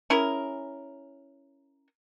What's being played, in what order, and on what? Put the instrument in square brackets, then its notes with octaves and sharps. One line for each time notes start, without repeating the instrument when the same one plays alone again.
[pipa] C#4 E4 G#4 A#4